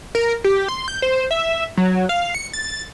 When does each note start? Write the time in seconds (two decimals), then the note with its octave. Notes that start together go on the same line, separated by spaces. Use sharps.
0.15 A#4
0.44 G4
0.68 C6
0.88 G6
1.02 C5
1.31 E5
1.77 F#3
2.09 F5
2.35 C#7
2.53 A6